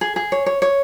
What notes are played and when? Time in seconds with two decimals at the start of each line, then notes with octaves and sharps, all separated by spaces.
0.01 G#4
0.16 G#4
0.32 C#5
0.46 C#5
0.62 C#5